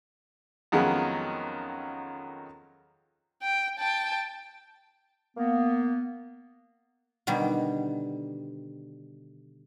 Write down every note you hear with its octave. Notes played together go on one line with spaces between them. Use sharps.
F2 D#3 F#3 G#3 B3 C#4
G5
G5 A5
A#3 B3
B2 D3 D#3 G3